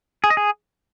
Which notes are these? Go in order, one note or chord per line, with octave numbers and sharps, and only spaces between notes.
G#4
D#5
G#4